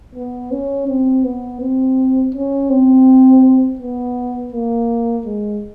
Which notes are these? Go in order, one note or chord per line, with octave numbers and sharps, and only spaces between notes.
B3
C#4
C4
B3
C4
C#4
C4
B3
A#3
G#3